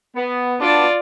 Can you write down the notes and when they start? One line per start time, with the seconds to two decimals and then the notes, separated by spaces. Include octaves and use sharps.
0.16 B3
0.61 B3 D4 F4 D5